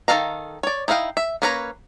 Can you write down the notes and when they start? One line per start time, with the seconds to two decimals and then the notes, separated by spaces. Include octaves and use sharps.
0.08 D#3 D4 A4 F5 A#5
0.63 C#5 D5
0.88 D#4 E4 D#5 F5 G5
1.17 E5
1.42 A#3 C#4 B4 C#5 A#5